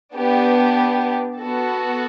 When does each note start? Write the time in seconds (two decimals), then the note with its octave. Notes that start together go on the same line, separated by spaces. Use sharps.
0.14 B3 D4 G4
1.39 B3 F#4 A4